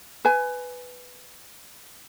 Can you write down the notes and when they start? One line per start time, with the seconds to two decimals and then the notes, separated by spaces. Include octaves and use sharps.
0.25 B4 G#5